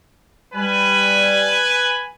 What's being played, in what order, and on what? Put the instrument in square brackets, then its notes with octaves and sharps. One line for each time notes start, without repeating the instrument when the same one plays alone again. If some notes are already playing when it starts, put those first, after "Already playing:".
[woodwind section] G3 [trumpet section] B4 G#5